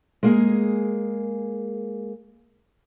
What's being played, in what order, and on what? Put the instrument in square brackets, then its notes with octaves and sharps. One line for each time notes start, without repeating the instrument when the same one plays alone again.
[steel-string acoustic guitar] G#3 A#3 G#4